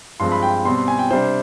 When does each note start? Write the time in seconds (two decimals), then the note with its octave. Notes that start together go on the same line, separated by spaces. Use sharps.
0.20 G2 F3 G#3 C4 C6
0.32 B5
0.43 G5
0.65 B2 G3 C4 C6
0.77 C6
0.88 G#5
0.99 G5
1.10 C3 G3 D4 C5